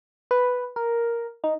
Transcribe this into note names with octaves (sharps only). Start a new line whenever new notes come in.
B4
A#4
D#4